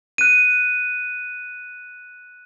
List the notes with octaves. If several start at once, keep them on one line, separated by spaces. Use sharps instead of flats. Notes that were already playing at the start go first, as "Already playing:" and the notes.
F#6 D#7